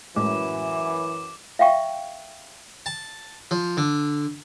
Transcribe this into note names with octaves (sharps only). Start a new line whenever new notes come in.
F#2 A2 E3 G#3 D6
E5 F5 G5 C#6
A5
F3
D3